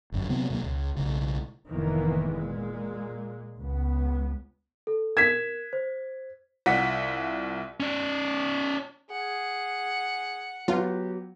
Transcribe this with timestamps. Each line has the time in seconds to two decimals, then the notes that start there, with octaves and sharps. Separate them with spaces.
0.12 G1 F#2
0.29 C3 F#3 B3 C4
0.50 B2 F#3 A3 A#3
0.63 C#2
0.97 B1 C#3
1.71 F1 A2 D#3 E3 A#3 B3
2.32 A#2 G#3
3.57 C#2 B3
4.87 A4
5.17 A#4 G#6 B6 E7
5.73 C5
6.66 C2 F4 F#5 B6
7.80 C#4 D5
9.10 G#4 F#5
10.68 F#3 B3 F4 G4 F#5